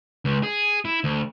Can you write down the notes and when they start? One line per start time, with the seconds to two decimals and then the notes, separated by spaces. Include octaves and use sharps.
0.25 C#2
0.43 G#4
0.85 E4
1.04 D2